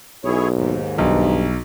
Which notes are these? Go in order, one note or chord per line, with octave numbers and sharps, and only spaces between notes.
B1 E4 G#4 C#5
D#2 G#2
B1 G2